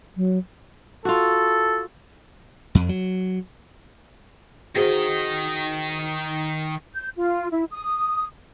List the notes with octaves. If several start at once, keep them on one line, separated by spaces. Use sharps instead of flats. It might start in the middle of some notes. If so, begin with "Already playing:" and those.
F#3
F4 F#4 A4
F2
F#3
D#3 F#4 G#4 C5 D#5
G6
F4
E4
D#6